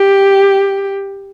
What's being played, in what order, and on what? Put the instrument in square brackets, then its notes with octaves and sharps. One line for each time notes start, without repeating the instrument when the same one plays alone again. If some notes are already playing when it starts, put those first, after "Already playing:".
Already playing: [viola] G4